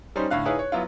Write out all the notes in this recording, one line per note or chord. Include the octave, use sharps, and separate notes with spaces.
G3 C#4 D#4 C5 C6
A2 D3 F5 F#6
D#4 E4 G#4 B4 C#5 F5
C#5
F#3 B3 E4 F4